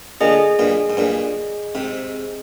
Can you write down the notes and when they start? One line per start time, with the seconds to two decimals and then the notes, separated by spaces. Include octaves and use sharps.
0.21 A#2 D3 G#4 D#5 G#5
0.59 G2 A#2
0.90 G#2
0.97 G2 A#2
1.75 G#2 C3